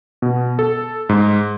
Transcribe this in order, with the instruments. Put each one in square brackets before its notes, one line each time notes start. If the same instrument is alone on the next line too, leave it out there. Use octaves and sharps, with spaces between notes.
[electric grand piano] B2
A4
G#2